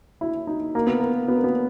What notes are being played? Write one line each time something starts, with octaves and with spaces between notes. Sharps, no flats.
E4
D#4
A#3
B3
A#3
B3
A#3
B3